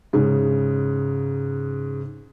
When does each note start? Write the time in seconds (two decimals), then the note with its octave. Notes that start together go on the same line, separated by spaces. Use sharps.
0.13 G#2 C#3